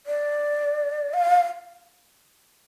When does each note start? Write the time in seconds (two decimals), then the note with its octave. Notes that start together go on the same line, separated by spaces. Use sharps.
0.06 D5
1.14 F5